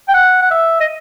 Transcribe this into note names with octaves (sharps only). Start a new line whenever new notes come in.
G5
F#5
F#5
E5
D#5